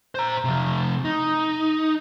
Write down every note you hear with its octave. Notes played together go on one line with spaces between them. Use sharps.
C5 A#5
C3 F3
D#4